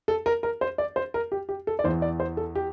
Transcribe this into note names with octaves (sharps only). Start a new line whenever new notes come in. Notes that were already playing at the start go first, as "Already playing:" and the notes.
A4
A#4
A#4
C5
D5
C5
A#4
G4
G4
A4
D5
E2 E3 C5
D5
C5
A4
G4